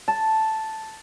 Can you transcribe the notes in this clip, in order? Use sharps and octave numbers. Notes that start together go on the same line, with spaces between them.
A5